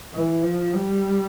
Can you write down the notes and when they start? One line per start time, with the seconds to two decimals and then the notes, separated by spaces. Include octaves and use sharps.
0.14 E3
0.43 F3
0.73 G3